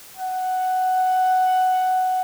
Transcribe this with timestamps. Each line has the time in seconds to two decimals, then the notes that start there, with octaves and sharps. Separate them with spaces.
0.17 F#5